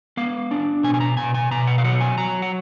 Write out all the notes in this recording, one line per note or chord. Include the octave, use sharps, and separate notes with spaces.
B3 F5
D4
B2 G#5
G#5
A#5
B2 G#5
G#5
B2 A#5
F#5
F5
F#3 F#5
G#5
F#3 A#5
F#5